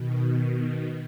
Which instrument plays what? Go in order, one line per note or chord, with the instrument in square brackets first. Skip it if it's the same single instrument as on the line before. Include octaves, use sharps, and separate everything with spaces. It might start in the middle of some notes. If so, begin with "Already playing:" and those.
Already playing: [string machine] B2 D#3